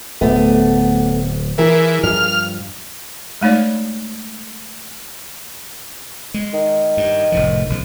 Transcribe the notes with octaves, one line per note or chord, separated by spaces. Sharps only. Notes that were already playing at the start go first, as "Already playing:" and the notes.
D1 D3 A3 B3
E3 G#4 A#4
G2 F3 F6
G#3 A3 D#4 C#5 D5
G#3
D#3
G2
F1 A2 F3
B1 C#3 F3